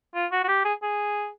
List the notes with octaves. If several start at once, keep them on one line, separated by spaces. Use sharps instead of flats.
F4
F#4
F#4
G4
G#4
G#4